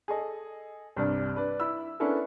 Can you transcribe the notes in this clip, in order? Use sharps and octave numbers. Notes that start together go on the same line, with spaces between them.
G#4 A4 D#5
C2 G2 C4 D4 D5
D4 B4 D5
E4 B5 E6
B3 C#4 D4 E4 A4 A#4